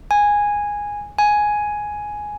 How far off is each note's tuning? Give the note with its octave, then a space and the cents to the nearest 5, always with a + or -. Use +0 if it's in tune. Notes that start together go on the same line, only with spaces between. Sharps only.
G#5 -10
G#5 +5